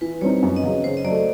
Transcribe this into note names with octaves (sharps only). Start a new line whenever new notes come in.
E3 B4
G3 C4 D#4 C#5
F#2
D#5
C#3 F#3
C#3 C5
D#5
F#3 A3 D5